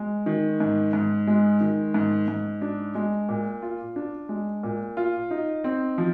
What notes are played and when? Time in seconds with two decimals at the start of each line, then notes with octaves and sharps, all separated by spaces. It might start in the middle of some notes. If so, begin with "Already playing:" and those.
Already playing: G#3
0.26 D#3
0.60 G#2
0.93 G#2
1.27 G#3
1.61 D#3
1.94 G#2
2.28 G#2
2.62 D4
2.95 G#3
3.29 A#2
3.62 F4
3.96 D4
4.29 G#3
4.63 A#2
4.97 F4
5.31 D#4
5.64 C4
5.98 F3